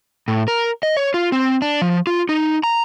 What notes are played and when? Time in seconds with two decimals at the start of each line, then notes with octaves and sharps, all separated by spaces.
0.28 A2
0.48 A#4
0.83 D#5
0.97 C#5
1.14 F4
1.32 C4
1.62 D4
1.82 F3
2.07 F4
2.29 D#4
2.63 A#5